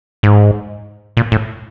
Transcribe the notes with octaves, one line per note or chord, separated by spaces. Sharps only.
G#2
A#2
A2